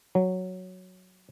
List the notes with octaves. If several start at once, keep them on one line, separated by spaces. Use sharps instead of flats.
F#3